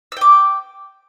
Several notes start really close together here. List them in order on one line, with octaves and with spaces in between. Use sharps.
E6 G5 D6